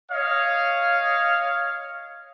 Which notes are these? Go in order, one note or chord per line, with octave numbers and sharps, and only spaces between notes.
C#5 D#5 F5